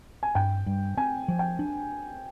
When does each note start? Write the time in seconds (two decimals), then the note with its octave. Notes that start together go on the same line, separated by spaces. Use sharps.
0.23 G#5
0.35 G2 G5
0.66 G2
0.97 C4 G#5
1.28 F3
1.39 G5
1.59 D4